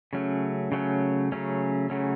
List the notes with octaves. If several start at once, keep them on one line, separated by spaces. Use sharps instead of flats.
C#3 F#3 A3 C#4
C#3 F#3 A3 C#4
C#3 F#3 A3 C#4
C#3 F#3 A3 C#4